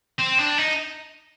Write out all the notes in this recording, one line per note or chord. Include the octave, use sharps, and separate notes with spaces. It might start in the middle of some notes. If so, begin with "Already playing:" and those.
C4
D4
D#4